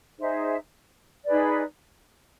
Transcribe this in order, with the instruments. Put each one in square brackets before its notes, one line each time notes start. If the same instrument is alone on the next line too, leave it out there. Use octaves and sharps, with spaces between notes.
[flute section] D#4 G#4 C5 E5
D#4 G#4 B4 D5